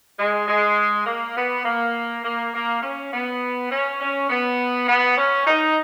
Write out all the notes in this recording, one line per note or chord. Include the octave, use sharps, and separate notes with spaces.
G#3
G#3
A#3
B3
A#3
A#3
A#3
C#4
B3
C#4
C#4
B3
B3
C#4
D#4